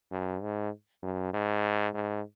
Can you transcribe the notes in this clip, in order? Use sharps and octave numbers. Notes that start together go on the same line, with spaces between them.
F#2
G#2
F#2
G#2
G#2